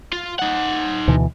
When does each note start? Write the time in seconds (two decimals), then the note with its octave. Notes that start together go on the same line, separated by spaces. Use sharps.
0.13 F4
0.39 D#4 F#5
1.07 D2 B2 E3